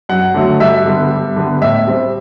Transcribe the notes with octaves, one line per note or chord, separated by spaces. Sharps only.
F#2 F#5
D3 F#3 A3
G2 E5
D3 G3 B3
G2
D3 G3 B3
A2 E5
G3 C4